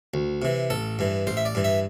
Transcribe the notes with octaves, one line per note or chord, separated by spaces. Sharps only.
D2
C3 E3
A1 A4
G2 E3
A1 C5
E5
D5
G2 E3
E5